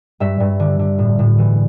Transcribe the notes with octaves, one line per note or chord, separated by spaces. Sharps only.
G2 E5
G2
D3
D3
A2
A2
E3